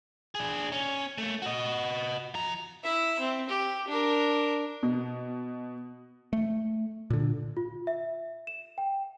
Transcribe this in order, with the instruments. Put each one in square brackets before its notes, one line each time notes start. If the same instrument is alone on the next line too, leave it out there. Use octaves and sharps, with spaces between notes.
[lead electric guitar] D4 G#4
C#4
A3 A#3
F#4 D#5
F3 A#5
[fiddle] E4 E5
C4
G4
D4 A#4
[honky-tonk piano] B2
[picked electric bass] A3
A#2 D3
[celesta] F4
E5
E7
G5